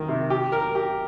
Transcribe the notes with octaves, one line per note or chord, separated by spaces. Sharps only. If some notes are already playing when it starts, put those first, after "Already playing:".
Already playing: D#3 A#3
C3
G4
A#4
G4